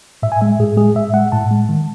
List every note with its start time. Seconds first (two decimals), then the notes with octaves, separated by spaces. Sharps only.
0.23 A2 E5
0.32 G#5
0.41 G#3 E5
0.59 A2 G#4
0.77 G#3 G#4
0.96 A2 E5
1.13 G#3 F#5
1.32 A2 A5
1.51 G#3
1.69 D#3